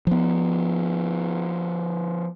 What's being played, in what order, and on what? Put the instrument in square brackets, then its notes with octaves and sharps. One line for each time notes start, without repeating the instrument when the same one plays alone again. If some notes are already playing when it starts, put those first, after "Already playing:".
[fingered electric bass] F3 B3